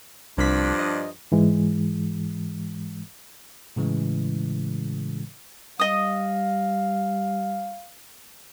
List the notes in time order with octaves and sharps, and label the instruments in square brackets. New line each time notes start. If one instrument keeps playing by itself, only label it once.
[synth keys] C2 B6 [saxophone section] G2 F3 D4
[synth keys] D#5
[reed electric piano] G#2 E3 G#3
[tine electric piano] A2 C#3 E3 G#3
[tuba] G3 [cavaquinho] D#5 D#6 [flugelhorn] F5